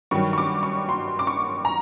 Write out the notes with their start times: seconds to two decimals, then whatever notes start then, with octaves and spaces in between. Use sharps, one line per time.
0.11 G2 D#3 F#3 C#6
0.33 C#6
0.38 D6
0.63 C#6
0.89 C6
1.19 D6
1.27 C#6
1.65 A#5